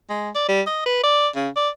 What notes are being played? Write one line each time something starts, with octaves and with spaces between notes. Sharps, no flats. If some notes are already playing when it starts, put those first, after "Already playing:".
G#3
D5
G3
D#5
B4
D5
C#3
D5